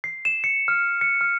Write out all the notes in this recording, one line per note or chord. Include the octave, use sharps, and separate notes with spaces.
C7
E7
C#7
F6
C#7
F6